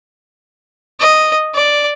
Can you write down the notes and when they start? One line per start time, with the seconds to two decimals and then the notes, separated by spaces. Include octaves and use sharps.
1.00 D#5
1.55 D5